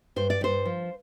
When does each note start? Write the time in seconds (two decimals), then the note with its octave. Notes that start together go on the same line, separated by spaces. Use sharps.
0.16 G2 C5
0.30 D5
0.41 G2 C5
0.65 F3